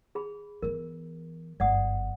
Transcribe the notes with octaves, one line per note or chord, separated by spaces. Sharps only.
G#4 B5
E3 B3 A#4
G1 F#2 D5 F#5 D#6